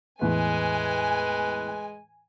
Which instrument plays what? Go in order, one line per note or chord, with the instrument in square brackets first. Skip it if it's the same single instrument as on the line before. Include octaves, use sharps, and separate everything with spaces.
[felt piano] E2 A2 [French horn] G#3 [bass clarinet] B4 [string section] G#5